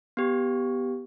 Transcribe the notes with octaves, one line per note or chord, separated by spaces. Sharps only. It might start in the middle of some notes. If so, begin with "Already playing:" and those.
B3 G4